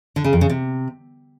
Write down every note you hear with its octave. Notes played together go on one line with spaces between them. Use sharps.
D3
C#3
F2
C#3
C3